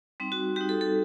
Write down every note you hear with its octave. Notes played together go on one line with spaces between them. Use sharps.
G3 C4 D#4
F#4
G3 C4 D#4 G4
A4
A4